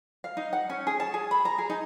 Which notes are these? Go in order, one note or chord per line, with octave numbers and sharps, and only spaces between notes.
F5
D#4
F#5
C#4
G#4
A5
G#4
B5
A#5
G#4
D#4